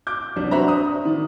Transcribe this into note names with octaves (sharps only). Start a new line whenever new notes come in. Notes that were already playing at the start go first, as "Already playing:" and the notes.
D6 G6
C2 F#3 D4
D4 F#4 C5 E5 A#5
D#6
D#3